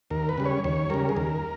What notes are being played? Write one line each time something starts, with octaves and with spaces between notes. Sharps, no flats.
D#2 A#4
B4
C#3 G3
C#5
D#2 C#5
C#3 G3 A#4
G#4
D#2 A#4